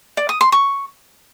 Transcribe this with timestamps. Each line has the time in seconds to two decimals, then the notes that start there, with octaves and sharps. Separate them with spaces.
0.17 D5
0.29 D#6
0.41 C6
0.52 C#6